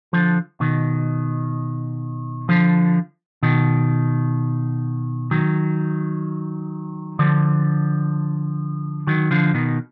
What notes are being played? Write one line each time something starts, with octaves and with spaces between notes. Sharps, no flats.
D3 F3
B2 D#3
D3 F3
B2 D#3
D#3 F#3
D3 F3
D#3 F#3
D3 F3
B2 D#3